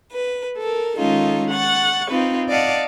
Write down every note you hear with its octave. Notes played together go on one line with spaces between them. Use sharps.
B4
A4 A#4
D#3 G#3 C#4 D#4 F4 A4
F#5 C#6 A6
C4 D#4 F4 B4
D5 D#5 F5 F#5 A5